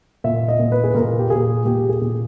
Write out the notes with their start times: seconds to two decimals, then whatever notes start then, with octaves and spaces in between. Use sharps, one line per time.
0.24 A#2 E5
0.48 D#5
0.60 A#2
0.72 B4
0.84 G#4
0.95 A#2 A#4
1.19 G4
1.30 A#2 G#4
1.65 A#2 G4
1.89 G#4
2.02 A#2